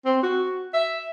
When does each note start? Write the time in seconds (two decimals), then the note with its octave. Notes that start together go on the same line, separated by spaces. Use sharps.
0.05 C4
0.23 F#4
0.74 E5